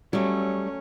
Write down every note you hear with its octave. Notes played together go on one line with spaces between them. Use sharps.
F#3 G3 A3 C#4